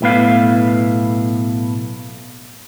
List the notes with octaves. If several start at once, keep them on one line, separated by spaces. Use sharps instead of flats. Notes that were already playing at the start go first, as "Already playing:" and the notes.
B1 A2 B3 F5